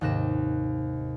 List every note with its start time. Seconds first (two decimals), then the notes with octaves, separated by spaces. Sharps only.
0.01 D#2 G#2 C3 F#6 A#6 E7